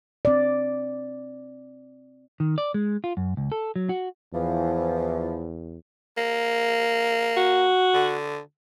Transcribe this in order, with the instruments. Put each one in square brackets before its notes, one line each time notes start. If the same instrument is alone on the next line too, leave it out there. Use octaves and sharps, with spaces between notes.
[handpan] C4 D5
[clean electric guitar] D#3
D5
G#3
F4
F#2
C#2
A4
F#3
F#4
[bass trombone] E2 [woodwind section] E3 F3
[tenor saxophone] A#3
[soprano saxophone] F#4
[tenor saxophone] D3